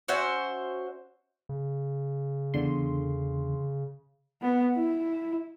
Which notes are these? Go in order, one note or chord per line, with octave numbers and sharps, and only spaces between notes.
C#4 F#4 C5 E5
C#3
E2 D3 C6
B3
E4